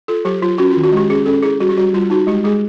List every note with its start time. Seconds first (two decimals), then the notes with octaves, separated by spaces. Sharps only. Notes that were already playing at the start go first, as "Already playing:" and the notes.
0.08 F4 A4
0.25 F#3 G4
0.42 F#3 F4
0.58 C#4 F#4
0.71 F4
0.76 D#3
0.84 F#4
0.92 G#3 G4
1.10 C#4 G#4
1.26 C#4 A4
1.43 E4 G#4
1.60 G3 F#4
1.69 G4
1.77 G3 F#4
1.93 G3 F4
2.10 D#4 F#4
2.27 G#3 G4
2.44 G#3 G#4